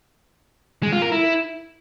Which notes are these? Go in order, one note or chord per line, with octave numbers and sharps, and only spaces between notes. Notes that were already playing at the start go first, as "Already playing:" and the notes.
G#3
F4
A#4
E4